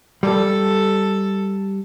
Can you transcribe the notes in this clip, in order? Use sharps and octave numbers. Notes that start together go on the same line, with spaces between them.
G3 A4